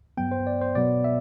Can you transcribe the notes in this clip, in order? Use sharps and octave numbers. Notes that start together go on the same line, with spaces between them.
G2 F#3 B3 G5
C5
D5
C5
B2 F#3 B3 D5
E5